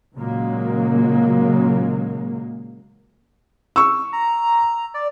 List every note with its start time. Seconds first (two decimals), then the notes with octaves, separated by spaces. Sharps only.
0.16 A#2 C#3 F#3 G#3 A#3
3.76 C#6 E6
4.13 A#5
4.94 D5